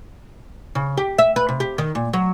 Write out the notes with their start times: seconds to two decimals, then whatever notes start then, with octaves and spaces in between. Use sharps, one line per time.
0.75 C#3
0.97 G4
1.18 E5
1.36 B4
1.49 C3
1.60 G4
1.78 D#3
1.95 A#2
2.13 F#3